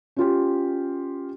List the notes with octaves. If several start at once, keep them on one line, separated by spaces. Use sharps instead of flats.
C#4 F4 G4